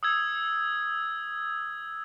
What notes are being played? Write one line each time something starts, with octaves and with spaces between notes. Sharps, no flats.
D#6 E6 G#6